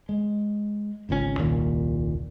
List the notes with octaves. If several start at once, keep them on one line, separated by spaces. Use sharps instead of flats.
G#3
G#1 C#2 C3 C#4
D#1 C2 A#2 D#3